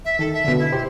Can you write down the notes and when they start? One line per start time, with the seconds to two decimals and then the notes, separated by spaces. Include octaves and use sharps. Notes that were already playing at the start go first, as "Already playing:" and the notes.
0.05 E5
0.19 D#3 A4
0.33 E5
0.45 B2 D3
0.59 E4
0.72 G4 C5